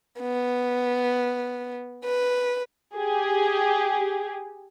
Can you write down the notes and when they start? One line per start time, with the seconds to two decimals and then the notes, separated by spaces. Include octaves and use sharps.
0.20 B3
2.05 B4
2.94 G4 G#4